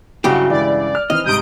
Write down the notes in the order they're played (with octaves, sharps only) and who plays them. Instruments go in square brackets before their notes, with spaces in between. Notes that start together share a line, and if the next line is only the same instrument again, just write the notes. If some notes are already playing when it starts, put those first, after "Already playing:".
[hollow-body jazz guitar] G2 C#3 G4 [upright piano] F#3 G3 E4 [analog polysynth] F#4
[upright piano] E3 G#3 E4 [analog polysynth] D5
[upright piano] F6
[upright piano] D#3 E3 C4 [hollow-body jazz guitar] D#5 [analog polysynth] F6
[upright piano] G#2 C3 G3 [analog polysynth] D#6 G6 D7